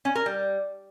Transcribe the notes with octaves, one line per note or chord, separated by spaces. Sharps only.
C#4
A#4
G3